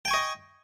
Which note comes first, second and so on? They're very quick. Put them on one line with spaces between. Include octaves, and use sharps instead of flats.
G5 G#5 C#6 D#5